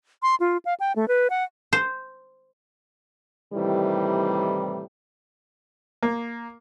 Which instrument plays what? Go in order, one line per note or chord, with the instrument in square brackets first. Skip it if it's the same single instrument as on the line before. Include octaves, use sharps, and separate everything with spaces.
[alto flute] C6
F4
F5
G5
A3
B4
F#5
[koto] C5
[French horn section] A2 C3 D#3 E3 G3
[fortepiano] A#3